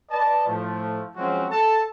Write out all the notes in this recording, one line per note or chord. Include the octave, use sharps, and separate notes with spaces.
B4 D5 D#5 A5
A2 F3 A3
F3 F#3 G#3 C4 C#4 F#4
A4 A5